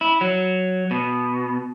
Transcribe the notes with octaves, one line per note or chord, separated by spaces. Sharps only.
E4
F#3
B2